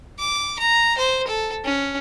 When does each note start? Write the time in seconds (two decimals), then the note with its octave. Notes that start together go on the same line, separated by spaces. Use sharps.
0.19 D6
0.59 A#5
0.98 C5
1.27 A4
1.64 C#4